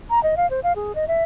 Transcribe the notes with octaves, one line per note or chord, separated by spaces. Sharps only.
A#5
D#5
F5
C5
F5
G#4
D#5
E5